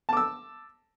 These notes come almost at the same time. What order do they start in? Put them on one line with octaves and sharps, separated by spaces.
A5 D6 E6